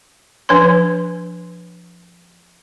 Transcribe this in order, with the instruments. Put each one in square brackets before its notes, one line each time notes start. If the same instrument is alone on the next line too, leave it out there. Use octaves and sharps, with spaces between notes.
[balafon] F3 D4 B4 C#5 C6